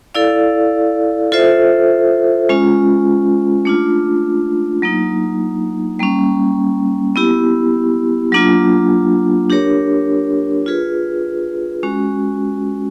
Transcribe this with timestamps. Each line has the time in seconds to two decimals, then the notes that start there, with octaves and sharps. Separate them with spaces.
0.15 E4 A4 D5 F5
1.32 F4 A4 C5 E5
2.49 G#3 C#4 F4
3.65 A3 D4 F4
4.82 F#3 A#3 D#4
5.99 G3 A#3 C#4
7.16 B3 E4 G4
8.32 F#3 A#3 D4 F4
9.50 D4 G4 A#4 C#5
10.66 F4 G#4 B4
11.83 G#3 C#4 F#4